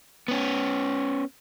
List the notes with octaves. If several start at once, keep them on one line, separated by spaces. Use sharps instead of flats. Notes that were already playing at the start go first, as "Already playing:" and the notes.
B3 C#4